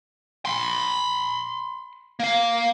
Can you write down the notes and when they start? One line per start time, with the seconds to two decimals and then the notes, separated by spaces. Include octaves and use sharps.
0.45 B5 C6
2.20 A#3 F5